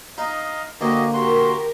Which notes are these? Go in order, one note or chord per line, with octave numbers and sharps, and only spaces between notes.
D#4 D#5 F5
D2 A#3 F#4 G4 D#5
F#4 G4 A#4 C6